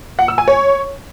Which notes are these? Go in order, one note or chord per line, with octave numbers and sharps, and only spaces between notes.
F#5
E6
G#5
C#5